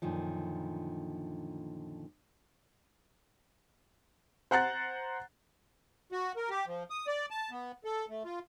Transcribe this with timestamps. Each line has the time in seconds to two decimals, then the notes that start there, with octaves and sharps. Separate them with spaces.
0.02 F#2 A#2 D3 D#3 F3
4.51 C5 F#5 A#5 F#6 A6
6.12 F#4
6.36 A#4
6.50 G4
6.67 F3
6.90 D#6
7.07 D5
7.31 A5
7.51 B3
7.84 A4
8.10 A3
8.24 F4